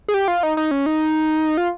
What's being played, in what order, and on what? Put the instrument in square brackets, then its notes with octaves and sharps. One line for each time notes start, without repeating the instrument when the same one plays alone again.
[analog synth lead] G#4
G4
F4
D#4
D#4
C#4
D#4
F4